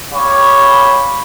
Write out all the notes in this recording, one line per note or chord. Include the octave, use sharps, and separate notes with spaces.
G4 C#5 F5 G5 B5